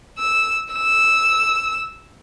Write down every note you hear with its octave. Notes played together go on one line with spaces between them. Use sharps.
E6
E6